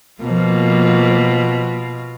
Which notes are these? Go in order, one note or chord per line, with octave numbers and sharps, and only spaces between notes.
B2 F3 A#3 F4